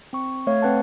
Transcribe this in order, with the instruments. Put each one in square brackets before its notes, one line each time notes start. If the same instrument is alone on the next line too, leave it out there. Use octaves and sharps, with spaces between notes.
[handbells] C4 C#6
A3 C#5 F5
C4 B4 F#5 A5